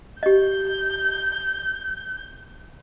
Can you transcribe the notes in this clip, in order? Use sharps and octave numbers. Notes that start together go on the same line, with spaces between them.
G4 D#5 G6